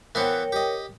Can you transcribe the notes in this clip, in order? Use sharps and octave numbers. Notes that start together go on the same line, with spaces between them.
E3 B3 A#4 C5 C#5 G5
G4 D#5